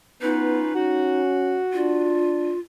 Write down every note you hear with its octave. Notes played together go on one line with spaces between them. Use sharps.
B3 C#4 D#4 F4 B4
C#4 F#4
D4 F4